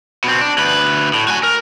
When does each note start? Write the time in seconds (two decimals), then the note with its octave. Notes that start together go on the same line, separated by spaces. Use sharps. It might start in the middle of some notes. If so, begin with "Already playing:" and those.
0.24 B2 C4
0.41 D4
0.58 D2 B4
1.14 A2
1.28 F#4 G#5
1.43 A#4